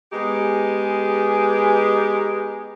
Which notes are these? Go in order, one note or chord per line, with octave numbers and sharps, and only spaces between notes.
G#3 B3 D#4 G4 G#4